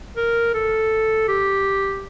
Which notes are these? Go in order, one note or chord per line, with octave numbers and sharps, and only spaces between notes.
A#4
A4
G4